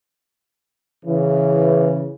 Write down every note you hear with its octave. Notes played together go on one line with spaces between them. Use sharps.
C#3 E3